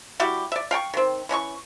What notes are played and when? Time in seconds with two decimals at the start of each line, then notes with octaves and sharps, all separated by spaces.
0.20 G3 E4 F#4 G4
0.52 D5 E5
0.71 F5 G5 A5 C#6
0.94 D#3 C4
1.29 E3 C#4 D#5 C#6